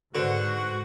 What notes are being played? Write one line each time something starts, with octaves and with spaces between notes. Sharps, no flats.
G#2 D3 F#4 B4 C5